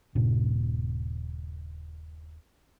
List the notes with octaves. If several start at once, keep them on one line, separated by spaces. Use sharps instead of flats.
D#1 G2 A#2 C#3